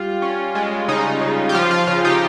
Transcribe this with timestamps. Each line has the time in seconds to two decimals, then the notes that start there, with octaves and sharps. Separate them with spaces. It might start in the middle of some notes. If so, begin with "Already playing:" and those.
Already playing: G3 F4
0.22 C#4
0.55 G#3
0.88 C#3 D#4
1.21 C#3
1.49 G4
1.54 F3 F4
1.71 F4
1.87 C#3 F4
2.04 D#4 G4